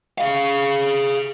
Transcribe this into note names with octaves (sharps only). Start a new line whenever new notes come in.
G#4 F5